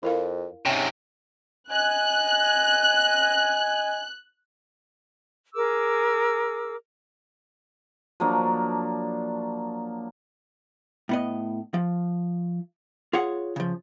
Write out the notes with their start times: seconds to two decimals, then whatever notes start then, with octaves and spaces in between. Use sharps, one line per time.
0.03 F2 E4 A#4 F5
0.66 G#2 C3 C#4 E5 G5
1.71 D#5 G#5 F#6
5.55 G#4 A#4 D6 E6
8.20 F3 F#3 A#3 D4
11.09 A2 B3 D#5
11.74 F3
13.13 F4 G#4 C#5 F#5
13.56 C#3 F3